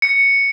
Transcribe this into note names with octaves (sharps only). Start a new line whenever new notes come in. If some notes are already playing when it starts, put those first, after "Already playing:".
C#7